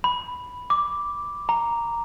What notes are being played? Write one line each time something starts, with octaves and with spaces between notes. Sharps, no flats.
B5
D6
A#5